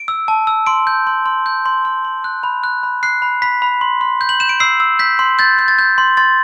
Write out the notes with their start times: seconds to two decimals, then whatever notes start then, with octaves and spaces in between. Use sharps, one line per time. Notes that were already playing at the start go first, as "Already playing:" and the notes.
Already playing: D7
0.08 E6
0.28 A5
0.47 E6
0.66 C6 D7
0.87 G6
1.07 C6
1.26 C6
1.46 G6
1.66 C6
1.85 C6
2.05 C6
2.24 F#6
2.43 B5
2.64 F#6
2.83 B5
3.03 F#6 C7
3.22 B5
3.42 B5 B6
3.62 B5
3.81 C6
4.01 C6
4.21 G6
4.29 F#7
4.40 G6 E7
4.49 D7
4.60 E6 C7
4.80 E6
4.99 G6 B6
5.19 C6
5.39 G6 A6
5.59 G6
5.68 A6
5.79 G6
5.98 C6
6.17 C6 A6